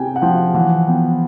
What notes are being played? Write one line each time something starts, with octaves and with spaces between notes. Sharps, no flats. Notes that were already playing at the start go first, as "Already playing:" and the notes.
Already playing: C3 G5 G#5
F#5
F3 G5
E3 F#5
B3 G5